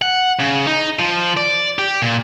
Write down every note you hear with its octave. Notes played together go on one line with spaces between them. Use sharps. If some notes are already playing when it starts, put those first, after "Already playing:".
F#5
C#3
D#4
F3
D5
G4
A#2